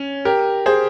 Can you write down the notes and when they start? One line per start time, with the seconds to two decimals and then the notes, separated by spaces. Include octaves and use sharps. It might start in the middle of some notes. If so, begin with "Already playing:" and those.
Already playing: C#4
0.25 G4 A#4
0.66 G#4 C5